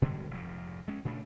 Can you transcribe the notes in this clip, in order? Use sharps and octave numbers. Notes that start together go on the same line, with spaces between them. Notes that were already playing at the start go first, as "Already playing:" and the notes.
B2 D3 G3 G#3
F1 G#2 F3
G#3 C#4
A#2 C#3 A3 D4